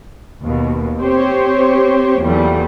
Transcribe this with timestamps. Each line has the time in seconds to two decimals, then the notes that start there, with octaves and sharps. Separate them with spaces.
0.44 D#2 B2
1.02 C4 G4 C5 C#5
2.22 E2 A#2 F#3 G3 A3